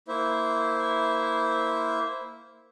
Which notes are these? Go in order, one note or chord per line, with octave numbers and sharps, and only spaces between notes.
A#3 E4 C5 E5